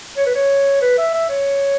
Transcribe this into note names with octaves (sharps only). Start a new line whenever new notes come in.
C#5
B4
C#5
B4
E5
E5
C#5